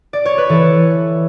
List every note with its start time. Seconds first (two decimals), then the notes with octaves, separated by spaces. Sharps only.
0.13 D5
0.25 C#5
0.38 B4
0.49 E3 A4